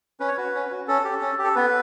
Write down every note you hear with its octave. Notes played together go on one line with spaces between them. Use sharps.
C#4 B4
C#5
F#4 B4
C#4
F#4
C#4 A4
G4
C#4
G4
A4
B3 B4